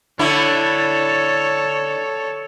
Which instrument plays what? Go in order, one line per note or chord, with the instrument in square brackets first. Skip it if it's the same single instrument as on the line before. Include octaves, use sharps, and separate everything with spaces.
[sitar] D3 E4 [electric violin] A4 C#5